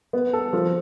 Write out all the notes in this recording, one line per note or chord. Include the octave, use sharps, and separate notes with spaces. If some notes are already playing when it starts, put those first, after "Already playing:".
B3
A4
F3